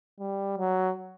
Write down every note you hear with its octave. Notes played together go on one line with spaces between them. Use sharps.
G3
F#3